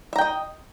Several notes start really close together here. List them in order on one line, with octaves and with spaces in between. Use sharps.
E5 A#5 G5 D#5